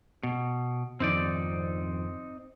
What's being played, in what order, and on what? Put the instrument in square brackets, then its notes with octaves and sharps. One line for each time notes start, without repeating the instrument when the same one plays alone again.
[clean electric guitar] B2
[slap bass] F2 G#2 D#3 [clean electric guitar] C4 D#4 D5